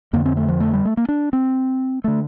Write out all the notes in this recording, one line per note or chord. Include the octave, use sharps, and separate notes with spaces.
F2 D3 A#3
C4
A3
F3
A3
G3
A3
A#3
D4
C4
D3 A3